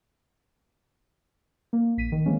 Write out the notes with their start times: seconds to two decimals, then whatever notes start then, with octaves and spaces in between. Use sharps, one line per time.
1.73 A#3
1.97 A#1 B6 D#7
2.12 D#3
2.26 E3 G#3 A#3 C4 C#4